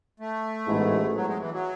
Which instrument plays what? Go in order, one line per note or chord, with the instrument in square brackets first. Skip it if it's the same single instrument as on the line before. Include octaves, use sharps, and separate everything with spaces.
[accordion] A3
[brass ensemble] A1 G#2 G#3 B3 E4
[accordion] F#3
G#3
E3
F#3